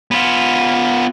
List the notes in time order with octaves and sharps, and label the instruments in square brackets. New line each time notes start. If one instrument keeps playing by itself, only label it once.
[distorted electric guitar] B3 F4